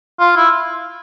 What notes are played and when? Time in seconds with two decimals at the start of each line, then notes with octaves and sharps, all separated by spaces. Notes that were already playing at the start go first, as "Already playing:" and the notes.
0.20 F4
0.36 E4